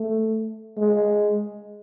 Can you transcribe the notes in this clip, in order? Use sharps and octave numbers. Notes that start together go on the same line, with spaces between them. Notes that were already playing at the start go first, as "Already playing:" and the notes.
Already playing: A3
G#3